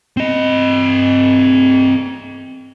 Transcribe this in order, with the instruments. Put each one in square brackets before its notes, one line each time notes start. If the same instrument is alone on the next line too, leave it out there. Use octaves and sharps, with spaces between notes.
[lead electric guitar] C4 D#5